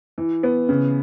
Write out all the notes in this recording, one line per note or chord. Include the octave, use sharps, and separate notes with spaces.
E3
B3
C#3